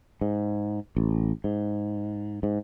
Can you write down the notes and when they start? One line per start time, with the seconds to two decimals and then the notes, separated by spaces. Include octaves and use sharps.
0.21 G#2
0.97 A1
1.44 G#2
2.43 G#2